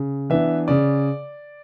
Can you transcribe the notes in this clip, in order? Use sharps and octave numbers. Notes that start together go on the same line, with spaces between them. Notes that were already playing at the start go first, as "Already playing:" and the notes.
Already playing: C#3
E3 B3 D4 E5
C#3 D5